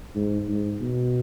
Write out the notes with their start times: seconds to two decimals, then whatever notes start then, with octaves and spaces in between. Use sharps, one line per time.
0.15 G#2
0.48 G#2
0.81 B2